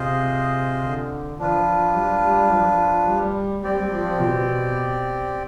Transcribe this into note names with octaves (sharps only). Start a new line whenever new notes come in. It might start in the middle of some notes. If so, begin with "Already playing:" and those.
Already playing: C3 F4 G#4 C5 D#5
D3
F3 D4 F4 B4
G3
G3
F3
G3
G3 C4 G4 D5
F3
B2